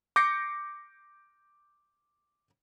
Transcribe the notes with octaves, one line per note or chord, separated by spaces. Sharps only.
D6 G6 A#6 C7 C#7